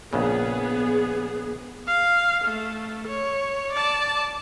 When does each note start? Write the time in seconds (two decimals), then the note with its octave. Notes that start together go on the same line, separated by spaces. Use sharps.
0.13 A#1 C#3 B3 G#4
1.87 F5
2.45 A3
3.08 C#5
3.73 D5 A5